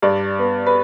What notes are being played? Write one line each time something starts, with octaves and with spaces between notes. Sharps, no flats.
G2 D5
B3
B4